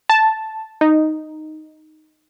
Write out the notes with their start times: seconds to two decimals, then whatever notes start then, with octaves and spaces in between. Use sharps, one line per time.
0.10 A5
0.81 D#4